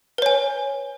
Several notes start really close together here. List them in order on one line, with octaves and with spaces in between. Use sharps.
B4 C#5 G#5